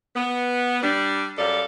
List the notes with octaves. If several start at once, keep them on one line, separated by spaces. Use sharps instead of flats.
B3
G3 D4
F#2 G3 A4 D5 F5